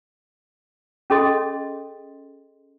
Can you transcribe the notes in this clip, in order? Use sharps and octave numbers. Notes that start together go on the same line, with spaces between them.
C#4 G#4 A4 D#5 C6